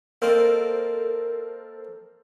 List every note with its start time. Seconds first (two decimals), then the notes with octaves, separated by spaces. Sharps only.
0.22 A#3 C4 D#4 A4 A#4 C5